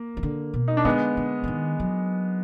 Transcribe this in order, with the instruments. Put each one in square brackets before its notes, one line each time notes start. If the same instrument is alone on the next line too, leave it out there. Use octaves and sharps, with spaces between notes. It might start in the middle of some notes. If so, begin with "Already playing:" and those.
Already playing: [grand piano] A#3
[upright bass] D#3
D3
B2
[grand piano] D#4
D4
[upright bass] D3 [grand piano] G#3 B3
[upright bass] D3
D3
D#3
F#3